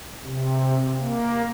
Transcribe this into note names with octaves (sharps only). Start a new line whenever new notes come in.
C3
A#3